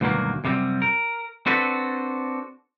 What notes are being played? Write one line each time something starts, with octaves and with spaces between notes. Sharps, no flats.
D2 G2 B2 D#3 F#3 A#3
F#2 C3 G3 C4
A#4
C4 D4 F#4 A4 B4